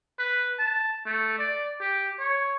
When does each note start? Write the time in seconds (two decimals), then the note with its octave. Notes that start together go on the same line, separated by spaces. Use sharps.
0.19 B4
0.59 A5
1.06 A3
1.39 D5
1.81 G4
2.19 C#5